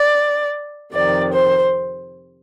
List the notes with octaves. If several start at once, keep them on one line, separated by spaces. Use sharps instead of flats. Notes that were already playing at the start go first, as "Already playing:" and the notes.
Already playing: D5
F2 C3 D#3 D5
C5